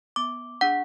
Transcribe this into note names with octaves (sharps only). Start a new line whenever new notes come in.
B3 D6
D4 G#4 F#5